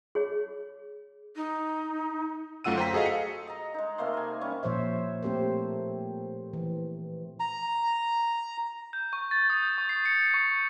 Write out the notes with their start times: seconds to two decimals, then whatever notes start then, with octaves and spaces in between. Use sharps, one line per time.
0.15 G#4 C#5 D6
1.36 D#4
2.64 F#2 A3 F4 F#5 E6 D#7
2.78 C5 G5 A#5 B6
2.93 F#4 G#4 A4 D#5 F5
3.06 C#7
3.47 D#5 A#5
3.74 G#3 D#4
3.98 C3 A3 A#3 C6
4.14 D#5 G#5
4.41 G3 C#4 C#6
4.63 A#2 F3 C5 C#5 E5
5.23 A3 C4 G4 A#4 C5
6.53 E3
7.40 A#5
8.93 G6
9.13 C#6
9.31 A6
9.50 D#6
9.63 G6
9.78 C#6
9.89 C7
10.06 C#7
10.22 C#7
10.34 C#6